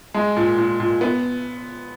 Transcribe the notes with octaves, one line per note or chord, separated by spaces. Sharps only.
G#3
A#2
A#2
A#2
B3